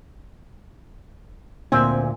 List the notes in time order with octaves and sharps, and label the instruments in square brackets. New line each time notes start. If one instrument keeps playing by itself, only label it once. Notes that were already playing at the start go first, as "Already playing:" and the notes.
[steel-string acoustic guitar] D2 A#2 G#5 [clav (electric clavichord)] C4